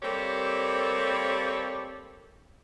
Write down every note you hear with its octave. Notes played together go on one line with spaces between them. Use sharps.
G3 A#3 C4 G4 A4 C#5